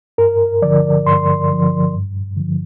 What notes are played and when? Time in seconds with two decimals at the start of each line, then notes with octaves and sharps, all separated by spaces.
0.18 G2 A#4
0.62 D3 F3 D5
1.06 G2 C6
1.50 D3 F3
1.94 G2
2.36 D3 F3